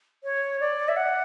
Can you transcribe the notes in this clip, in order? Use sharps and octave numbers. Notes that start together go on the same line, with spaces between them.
C#5
D5
E5
F#5